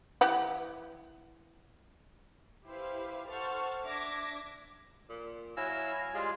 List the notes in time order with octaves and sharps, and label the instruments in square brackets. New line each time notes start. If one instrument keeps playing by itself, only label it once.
[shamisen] E3 G4 F#5
[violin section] E4 G4 B4 C5 F5
A4 C5 F#5 C#6 F6 A6
D4 E5 D6 G#6 A#6
[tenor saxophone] A#2
[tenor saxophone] F#3 [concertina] E4 E6 [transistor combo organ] F5 G#5 [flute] A#6
[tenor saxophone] G3 [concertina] G#3 F4 G#4 [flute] C6